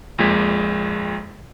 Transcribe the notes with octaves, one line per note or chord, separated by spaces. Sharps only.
A#1 F2 A#2 G#3 G#6 B6